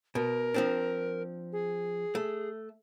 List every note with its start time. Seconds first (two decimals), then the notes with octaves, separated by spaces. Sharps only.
0.15 B2 A#4
0.54 F3 C4 D4
1.52 G#4
2.15 A3